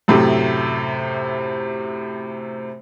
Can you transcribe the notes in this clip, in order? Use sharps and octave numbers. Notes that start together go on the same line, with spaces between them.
F#2 A2 C3 A3